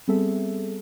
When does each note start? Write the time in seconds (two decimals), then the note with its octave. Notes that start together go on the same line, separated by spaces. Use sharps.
0.08 G3 B3 C4 G#4 A4 E5